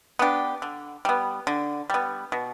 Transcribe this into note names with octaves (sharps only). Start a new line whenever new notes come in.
B3 D4 G4
D3
G3 B3
D3
G3 B3
B2